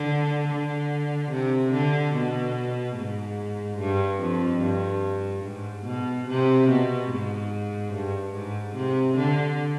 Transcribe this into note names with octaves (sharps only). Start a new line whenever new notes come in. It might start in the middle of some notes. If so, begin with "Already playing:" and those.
Already playing: D3
D3
C3
D3
B2
G#2
G2
F2
G2
G#2
B2
C3
B2
G#2
G2
G#2
C3
D3